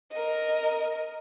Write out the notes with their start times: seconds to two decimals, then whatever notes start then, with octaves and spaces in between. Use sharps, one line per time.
0.11 A#4 D#5